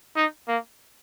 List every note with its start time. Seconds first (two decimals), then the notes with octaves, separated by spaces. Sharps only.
0.16 D#4
0.48 A#3